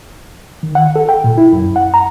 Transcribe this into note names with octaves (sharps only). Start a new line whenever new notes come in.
D#3
F#5
A4
G5
A#2
E4
F#2
F#5
A#5